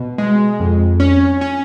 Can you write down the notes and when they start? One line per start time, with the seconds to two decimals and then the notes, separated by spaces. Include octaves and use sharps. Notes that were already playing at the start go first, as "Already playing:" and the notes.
Already playing: B2
0.18 G#3
0.60 F2
1.00 C#4
1.41 C#4